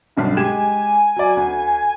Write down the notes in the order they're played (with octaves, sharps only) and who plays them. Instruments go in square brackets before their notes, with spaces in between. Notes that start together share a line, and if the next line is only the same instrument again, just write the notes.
[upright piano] B1 G2 D3
[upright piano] G#3 G4 E7 [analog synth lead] G#5
[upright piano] F#3 D5
D2